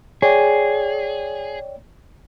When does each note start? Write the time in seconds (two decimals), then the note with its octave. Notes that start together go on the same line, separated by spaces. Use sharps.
0.22 G#4 C#5 D5 G5